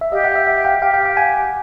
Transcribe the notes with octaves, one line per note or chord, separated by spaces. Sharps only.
E5
G4 D#5 F5
E5 F#5
E5 F#5
E5 F#5
F5 G5
G4 F5 G5
F5 G5
F5 G5
F#5 G#5